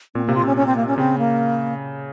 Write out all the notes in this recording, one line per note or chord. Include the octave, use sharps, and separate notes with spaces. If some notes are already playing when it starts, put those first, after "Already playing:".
A#2 C4
C3 A#3
F4
C3 C#4
C#4
C4
A#3
C#4
C#3 C4
A#3